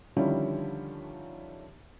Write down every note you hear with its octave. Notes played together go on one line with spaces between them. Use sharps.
D3 D#3 F3 G3 C#4 E4